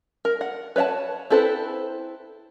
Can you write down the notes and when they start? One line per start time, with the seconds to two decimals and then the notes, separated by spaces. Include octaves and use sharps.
0.25 A#4
0.41 F#5
0.76 B4 C#5 E5 F#5 A5
1.30 C4 E4 A4 B4 C5